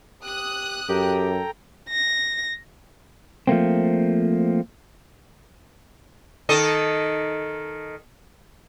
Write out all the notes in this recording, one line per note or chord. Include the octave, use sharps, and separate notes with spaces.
G4 D#6 F#6
F#2 G4 A4 G5 A#5
A#6
F3 A3 A#3 C4
D#3 A4 D#5